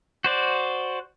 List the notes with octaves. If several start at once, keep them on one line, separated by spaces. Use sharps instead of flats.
F#4 C5 D5